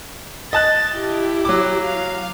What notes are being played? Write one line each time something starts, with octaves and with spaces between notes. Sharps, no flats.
D#5 A5 F#6 A6
E4 G4
F#3 D6
F5